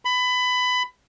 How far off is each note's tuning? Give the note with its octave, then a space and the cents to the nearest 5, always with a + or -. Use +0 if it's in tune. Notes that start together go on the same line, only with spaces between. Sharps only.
B5 +20